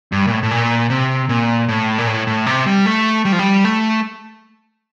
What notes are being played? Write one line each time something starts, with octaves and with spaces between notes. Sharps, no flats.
G2
A#2
A2
A2
A#2
C3
A#2
A2
A#2
A2
A2
C3
G3
A3
G3
F3
G3
A3